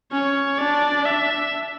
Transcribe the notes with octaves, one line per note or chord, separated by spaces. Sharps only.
C#4 C#5
D4 D5
E5